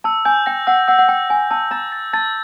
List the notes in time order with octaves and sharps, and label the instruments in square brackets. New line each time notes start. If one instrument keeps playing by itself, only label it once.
[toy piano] A5 [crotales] E6
[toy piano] G#5 [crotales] G6
[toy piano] G5 [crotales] A#6
[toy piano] F#5 [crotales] E6
[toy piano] F#5 [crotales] E6
[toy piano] F#5
[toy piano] G5 [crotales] E6
[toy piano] G#5 [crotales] E6
[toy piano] A5 [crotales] E6
[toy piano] A#5 [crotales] A6
[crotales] A6
[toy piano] A5 [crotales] A6